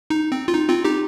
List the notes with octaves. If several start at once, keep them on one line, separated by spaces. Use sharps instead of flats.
D#4
C4
F4
D#4
C4 F4
D#4 G4